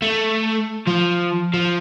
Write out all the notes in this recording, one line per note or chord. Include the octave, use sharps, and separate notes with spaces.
A3
F3
F3